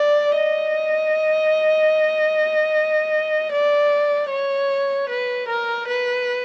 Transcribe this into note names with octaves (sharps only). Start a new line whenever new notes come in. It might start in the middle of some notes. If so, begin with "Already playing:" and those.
Already playing: D5
D#5
D5
C#5
B4
A#4
B4